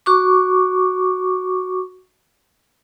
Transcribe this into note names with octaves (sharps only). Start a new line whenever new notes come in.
F#4 C#6 D6